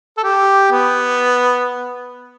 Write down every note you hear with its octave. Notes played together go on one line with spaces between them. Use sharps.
A4
G4
B3